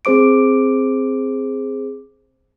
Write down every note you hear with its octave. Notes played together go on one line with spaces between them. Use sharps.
C4 G#4 C5 D6 D7